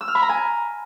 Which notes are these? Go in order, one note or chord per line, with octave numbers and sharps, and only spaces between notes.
E6
F6
B5
A#5
G#5